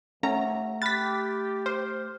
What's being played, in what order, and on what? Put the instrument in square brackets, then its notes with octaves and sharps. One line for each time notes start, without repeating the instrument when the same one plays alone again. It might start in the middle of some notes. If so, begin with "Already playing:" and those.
[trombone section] D#2 C3 [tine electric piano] A3 [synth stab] C#4 A#5 [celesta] F#5
[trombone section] G4 [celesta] B5 F6 F#6 [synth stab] A6 B6
[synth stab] C5 [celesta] F6